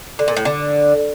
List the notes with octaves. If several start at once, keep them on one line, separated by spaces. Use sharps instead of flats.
D3
A#2
A2
D3